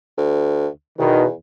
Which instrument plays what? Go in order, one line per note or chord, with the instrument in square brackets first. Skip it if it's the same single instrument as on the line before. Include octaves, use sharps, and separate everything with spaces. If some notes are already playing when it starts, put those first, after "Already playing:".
[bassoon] D2
[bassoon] E2 [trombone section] B2 D#3